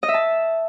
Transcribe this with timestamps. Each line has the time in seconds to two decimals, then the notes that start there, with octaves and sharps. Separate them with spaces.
0.03 D#5
0.08 E5
0.14 A5